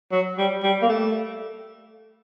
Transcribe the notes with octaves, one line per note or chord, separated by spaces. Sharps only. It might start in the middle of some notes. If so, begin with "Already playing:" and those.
F#3
G3
G3
A#3
A3